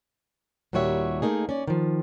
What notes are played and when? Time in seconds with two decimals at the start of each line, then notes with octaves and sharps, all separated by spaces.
0.73 D#2 A#2 G3 F#4 C#5 E5
1.22 A3 A#3 D#4 G#4
1.49 C#4 D5
1.67 D#3 F3